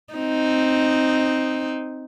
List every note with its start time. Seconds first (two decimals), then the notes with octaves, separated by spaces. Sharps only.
0.14 C4 D#4